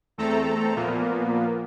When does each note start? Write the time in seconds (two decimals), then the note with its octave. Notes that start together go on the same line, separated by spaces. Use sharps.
0.18 E2 A3 C4 A4 A#5
0.76 A#2 F3 A#3 B3